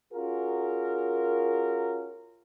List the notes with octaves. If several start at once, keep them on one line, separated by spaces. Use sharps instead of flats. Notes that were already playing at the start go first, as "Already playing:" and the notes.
C#4 F4 F#4 G#4 A#4